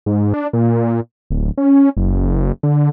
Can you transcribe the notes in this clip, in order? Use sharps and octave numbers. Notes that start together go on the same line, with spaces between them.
G#2
D4
A#2
D1
C#4
F#1
D3